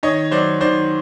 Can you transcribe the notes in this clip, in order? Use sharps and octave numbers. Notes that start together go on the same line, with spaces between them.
D#3 C#5 D#5
F#3 C5 D5
D#3 C5 D5